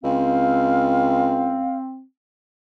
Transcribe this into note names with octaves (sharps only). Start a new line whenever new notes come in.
C#2 C4 F5